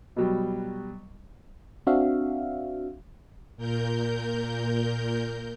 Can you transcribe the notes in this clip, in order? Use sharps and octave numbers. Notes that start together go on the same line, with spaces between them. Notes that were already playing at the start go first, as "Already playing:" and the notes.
B2 F#3 G3
C4 D4 F#4 E5 F5
A#2 A#4 G6